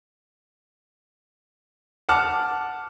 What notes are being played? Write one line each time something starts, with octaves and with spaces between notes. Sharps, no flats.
F#5 A5 D6 F6